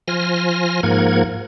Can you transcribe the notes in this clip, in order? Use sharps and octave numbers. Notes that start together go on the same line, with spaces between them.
F3 G#5 C6 F6 A#6
G#2 F3 A#3 A#4 F#5 G#6